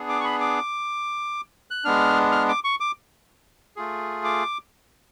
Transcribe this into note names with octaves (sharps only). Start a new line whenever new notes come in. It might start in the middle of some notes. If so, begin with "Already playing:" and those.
Already playing: B3 D4 G#4
D6
C#6
B5
D6
F#6
G#3 B3 D4 F6
F6
D6
C#6
D6
A3 F4 G#4
D6